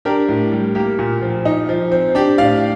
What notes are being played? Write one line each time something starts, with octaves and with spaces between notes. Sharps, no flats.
D4 G4 A#4
A2
G3
A#3 G4
A#2
F3
D#4
F3
C4
D4 G4
A2 D5 F5